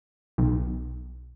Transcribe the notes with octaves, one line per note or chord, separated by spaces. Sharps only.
B1